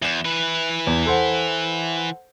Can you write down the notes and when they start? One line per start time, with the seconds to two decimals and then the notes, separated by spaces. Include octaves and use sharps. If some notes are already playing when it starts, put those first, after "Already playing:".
0.02 E2 E7 G7
0.25 E3 B4
0.87 E2
1.06 A4 C5 F#5